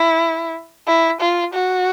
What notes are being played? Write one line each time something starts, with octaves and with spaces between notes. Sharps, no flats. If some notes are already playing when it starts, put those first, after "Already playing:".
Already playing: E4
E4
F4
F#4